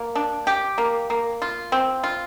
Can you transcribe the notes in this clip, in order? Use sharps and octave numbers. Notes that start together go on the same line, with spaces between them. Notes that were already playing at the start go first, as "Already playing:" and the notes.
Already playing: A#3
D4
G4
A#3
A#3
F4
C4
F4